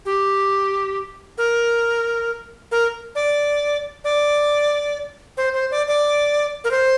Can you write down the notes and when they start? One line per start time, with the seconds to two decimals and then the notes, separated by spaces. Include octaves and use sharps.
0.05 G4
1.38 A#4
2.71 A#4
3.15 D5
4.04 D5
5.37 C5
5.54 C5
5.71 D5
5.87 D5
6.64 A#4
6.71 C5